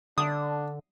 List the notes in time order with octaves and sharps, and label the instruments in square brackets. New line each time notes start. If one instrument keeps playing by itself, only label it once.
[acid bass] D3 [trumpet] D4 [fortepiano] D#6